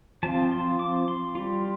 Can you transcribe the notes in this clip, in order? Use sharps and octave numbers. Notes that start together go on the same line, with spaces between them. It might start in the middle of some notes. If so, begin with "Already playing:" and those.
F3 C4 F4 A5
C6
D6
C6
G3 F4